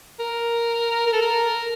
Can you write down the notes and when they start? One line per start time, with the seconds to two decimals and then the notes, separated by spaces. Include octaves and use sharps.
0.19 A#4
1.07 A#4
1.13 A4
1.21 A#4